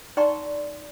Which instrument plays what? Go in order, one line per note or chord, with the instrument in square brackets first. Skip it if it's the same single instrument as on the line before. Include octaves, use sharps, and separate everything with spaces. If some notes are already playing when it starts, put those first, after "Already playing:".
[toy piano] D#4 D5 G5 A#5 C6 C#6